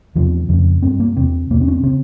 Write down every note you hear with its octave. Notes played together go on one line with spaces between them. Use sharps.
E2 C3 F3
F2 C#3
G2 C4
A#3
E2 C3 C4
E2 C3 A#3
C4
C#4
C4
C#3 C4